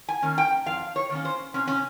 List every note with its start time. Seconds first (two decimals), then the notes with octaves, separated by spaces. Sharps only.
0.08 G#5
0.22 D#3 A#3 C#4
0.38 G5
0.66 F2 F5
0.96 C#5
1.10 D#3 A#3 C#4
1.25 C5
1.54 C3 C#4
1.67 C#4